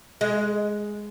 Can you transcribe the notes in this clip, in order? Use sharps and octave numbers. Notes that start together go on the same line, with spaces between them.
G#3